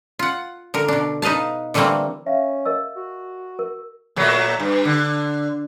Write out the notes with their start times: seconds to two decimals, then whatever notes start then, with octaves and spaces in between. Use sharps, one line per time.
0.19 F4 F#5
0.74 D3 A#4
0.88 B2 D4
1.22 D#4 B4 D#5 F5 A5
1.74 D3 E3 G3 A3 A#3 C4
2.26 C#4 E5 F5
2.65 A#4 D#5 E6
2.96 F#4
3.59 A#4
4.16 A#2 F#3 A3
4.60 G2
4.85 D3